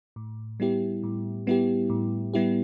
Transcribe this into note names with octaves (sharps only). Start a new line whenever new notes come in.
A2
G3 B3 E4 G4
A2
G3 B3 E4 G4
A2
G3 B3 E4 G4